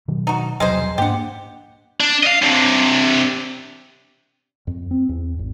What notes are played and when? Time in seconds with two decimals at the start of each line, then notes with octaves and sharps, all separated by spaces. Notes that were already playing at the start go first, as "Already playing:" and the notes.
0.08 B2 D#3 F#3
0.27 D#4 F#4
0.60 E1 C2 F#3 G#3 G#4 C5
0.98 G#2 A#3 D4 G4 F#5
2.00 D4
2.23 D#5 F5
2.42 C3 D4
4.67 F2
4.91 C4
5.09 E2
5.39 G#1